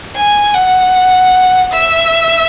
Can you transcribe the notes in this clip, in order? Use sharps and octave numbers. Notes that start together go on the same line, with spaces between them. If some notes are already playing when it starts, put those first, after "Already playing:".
G#5
F#5
E5